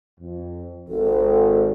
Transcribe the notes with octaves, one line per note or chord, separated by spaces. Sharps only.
F2
G#1 A4